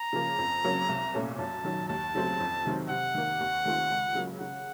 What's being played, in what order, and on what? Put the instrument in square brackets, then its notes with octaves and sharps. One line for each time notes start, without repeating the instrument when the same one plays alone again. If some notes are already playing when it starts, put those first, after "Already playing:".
Already playing: [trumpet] A#5
[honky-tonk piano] C#3 F3 A#3
F2
C#3 F#3 A#3 C#4
C2
A#2 A3 C#4
[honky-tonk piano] F#2 [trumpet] A5
[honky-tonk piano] D#3 F#3
[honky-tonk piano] D#2 [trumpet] A5
[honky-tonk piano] C#3 F#3 A3 C4
F2
C3 D#3 F#3 C4
[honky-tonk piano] C3 [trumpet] F#5
[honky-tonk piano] D#3 A#3
D#2
D#3 A3 C4 F4
C#2
C#3 F#3 A#3
[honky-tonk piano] C#3 [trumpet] F#5